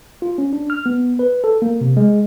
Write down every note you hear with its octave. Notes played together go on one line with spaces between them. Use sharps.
F4
C#4
D4
F6
B3
B4
A4
A#3
C3
G#3